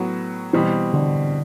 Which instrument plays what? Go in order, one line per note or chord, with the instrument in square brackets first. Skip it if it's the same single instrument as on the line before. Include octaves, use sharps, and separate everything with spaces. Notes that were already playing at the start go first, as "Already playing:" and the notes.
Already playing: [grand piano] A2 F#3 B3 F#4
[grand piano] B2 G3 C4 [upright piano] E3
[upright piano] D3